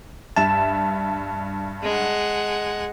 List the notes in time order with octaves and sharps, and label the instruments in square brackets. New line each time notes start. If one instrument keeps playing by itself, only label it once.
[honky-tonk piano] G2 E5 E7 [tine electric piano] A5
[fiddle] G#3 F#5